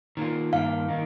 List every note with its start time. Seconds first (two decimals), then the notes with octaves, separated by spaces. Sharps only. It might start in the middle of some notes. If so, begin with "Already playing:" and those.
0.17 D#3 A#3 F4
0.52 G2 D#3 A#3 F5
0.88 D#3 A#3 D#4